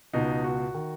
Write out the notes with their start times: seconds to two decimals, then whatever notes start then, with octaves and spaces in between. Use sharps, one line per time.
0.14 C#2 B2 D#4
0.44 F#4
0.75 D#3